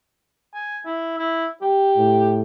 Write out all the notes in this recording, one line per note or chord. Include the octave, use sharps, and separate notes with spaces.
G#5
E4
E4
G4
A2